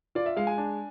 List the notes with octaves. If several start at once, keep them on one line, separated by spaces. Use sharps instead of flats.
F4 D5
E5
G#3 F5
G#5
D4